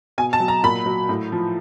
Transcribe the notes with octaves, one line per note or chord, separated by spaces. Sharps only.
B2 G#5
A5
F#3
A#5
A#2 B5
F#3
A2
F3